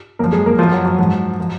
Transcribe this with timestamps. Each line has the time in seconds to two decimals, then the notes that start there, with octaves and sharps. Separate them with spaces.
0.19 F#2 F3 A#3 A#4
0.32 G#3 G#4
0.46 A#3 A#4
0.59 F#2 F3 F4
0.72 F#3 F#4
0.85 F#3 F#4
0.99 G#2 F3
1.40 F3